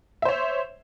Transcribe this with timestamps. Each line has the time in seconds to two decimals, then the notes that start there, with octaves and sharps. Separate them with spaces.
0.22 E5
0.25 C5
0.29 C#5